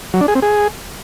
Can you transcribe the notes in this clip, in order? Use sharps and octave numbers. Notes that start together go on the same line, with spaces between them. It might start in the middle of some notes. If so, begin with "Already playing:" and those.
F#3
D4
G#4
C4
G#4